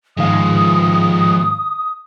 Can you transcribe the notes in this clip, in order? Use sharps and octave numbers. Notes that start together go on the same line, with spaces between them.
G#2 D#3 F3 G#3 F5 D#6